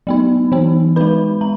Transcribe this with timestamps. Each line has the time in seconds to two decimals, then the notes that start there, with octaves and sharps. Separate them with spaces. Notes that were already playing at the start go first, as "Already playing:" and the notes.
0.07 F#3 B3 D#4
0.52 E3 B3 D#4
0.96 G#3 D#4 B4 B5
1.41 G#3 A#5